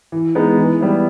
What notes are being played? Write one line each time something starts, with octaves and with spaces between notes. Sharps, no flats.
E3
G#3 B3 D#4
E3
G3 B3 E4